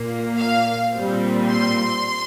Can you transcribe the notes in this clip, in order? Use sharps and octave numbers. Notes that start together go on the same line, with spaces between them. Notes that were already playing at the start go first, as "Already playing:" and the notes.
Already playing: A#2 A#3
F5
A#2 G3 C4
C6